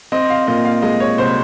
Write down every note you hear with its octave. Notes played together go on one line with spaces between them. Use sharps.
C4 D#5
F5
A#2 D#5
F5
G#3 D#5
C#5
C2 C5